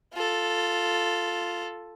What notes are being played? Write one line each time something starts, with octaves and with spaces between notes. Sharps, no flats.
F4 A4